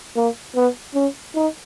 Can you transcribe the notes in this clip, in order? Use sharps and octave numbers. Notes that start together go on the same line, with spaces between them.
A#3
B3
C#4
D#4